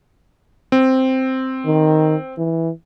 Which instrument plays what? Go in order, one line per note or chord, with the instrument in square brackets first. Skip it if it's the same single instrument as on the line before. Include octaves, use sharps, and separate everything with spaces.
[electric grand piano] C4
[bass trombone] D#3
E3